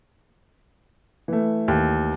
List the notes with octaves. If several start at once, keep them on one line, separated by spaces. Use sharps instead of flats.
E3 A3
D#2